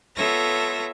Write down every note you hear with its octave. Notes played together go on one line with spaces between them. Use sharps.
B3 F4 A4 C#5 E5 A#6